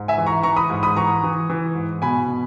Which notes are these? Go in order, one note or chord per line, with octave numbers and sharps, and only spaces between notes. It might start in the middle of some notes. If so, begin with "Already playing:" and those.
Already playing: G#2
E5 G#5
E3
A#5 C#6
E3 A#5 C#6
B5 D#6
G#2
B5 D#6
E3 A#5 C#6
E3
E3
G#2
B2 G#5 B5
B2